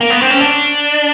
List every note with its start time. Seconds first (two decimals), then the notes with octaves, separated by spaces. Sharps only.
0.01 A#3
0.10 B3
0.20 C4
0.30 C#4
0.40 D4